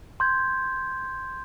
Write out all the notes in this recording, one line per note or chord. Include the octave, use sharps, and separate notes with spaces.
C6 G6 G#6